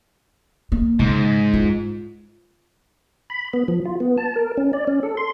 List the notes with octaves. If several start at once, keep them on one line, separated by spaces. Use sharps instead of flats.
A#3
G#2 C#3
F4
B5
B3
F3
F4
B3
A5
A#4
C#4
D5
C#4
A4
C6